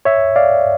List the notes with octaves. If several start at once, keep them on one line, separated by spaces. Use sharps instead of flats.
C#5 E5
D5 F5